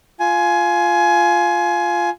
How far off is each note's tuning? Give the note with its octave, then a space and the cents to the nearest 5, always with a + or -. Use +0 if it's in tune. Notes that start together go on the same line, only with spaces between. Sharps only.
F4 +0 G#5 +20